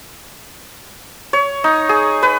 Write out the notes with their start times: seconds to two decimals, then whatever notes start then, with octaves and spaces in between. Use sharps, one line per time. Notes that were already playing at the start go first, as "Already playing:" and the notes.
1.33 C#5
1.64 D#4
1.89 G#4
2.23 B4